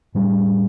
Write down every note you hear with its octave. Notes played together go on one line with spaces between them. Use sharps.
A2 G3 D4